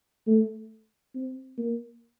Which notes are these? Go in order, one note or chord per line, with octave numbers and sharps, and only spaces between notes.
A3
C4
A#3